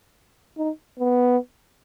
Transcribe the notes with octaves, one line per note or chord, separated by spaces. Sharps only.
D#4
B3